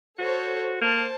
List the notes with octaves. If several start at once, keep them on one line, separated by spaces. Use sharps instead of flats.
F#4 A4 C5 C#5
A#3 C5 A5